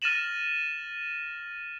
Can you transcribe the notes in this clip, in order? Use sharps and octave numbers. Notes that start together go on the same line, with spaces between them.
F6 A6 A#6 D#7 E7 F#7